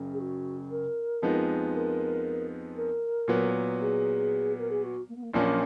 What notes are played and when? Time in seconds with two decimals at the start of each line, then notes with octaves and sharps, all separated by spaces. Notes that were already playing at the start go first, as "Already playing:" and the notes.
Already playing: F#1 F#2 C#3
0.13 G#4
0.19 F#4
0.70 A#4
1.22 F2 F3 G#3 B3 D#4
1.74 A#4
2.76 A#4
3.28 A#2 F#3 B3
3.80 G#4
4.58 A#4
4.70 G#4
4.83 F#4
5.09 A#3
5.16 B3
5.23 A#3
5.34 A#1 A#2 F3 F#3 A#3 C#4